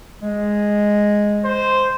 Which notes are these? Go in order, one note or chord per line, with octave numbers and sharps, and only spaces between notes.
G#3
C5